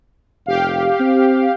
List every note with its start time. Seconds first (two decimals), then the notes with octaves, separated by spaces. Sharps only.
0.46 F1 G4 F5
1.00 C4